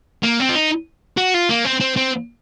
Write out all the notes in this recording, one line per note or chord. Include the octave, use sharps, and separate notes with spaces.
A#3
C4
F4
D#4
F#4
F4
A#3
C4
C4
C4